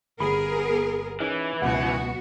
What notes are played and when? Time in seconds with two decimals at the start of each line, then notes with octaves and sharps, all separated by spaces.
0.20 G1 B3 G#4 A#4 B5
1.20 E3 C#4 D#4 E4
1.62 C#2 F#2 B2 B3 F#4 F#5